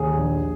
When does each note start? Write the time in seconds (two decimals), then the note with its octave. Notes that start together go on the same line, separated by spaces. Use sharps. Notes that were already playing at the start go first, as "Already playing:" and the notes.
Already playing: D#2 G#4
0.16 A#1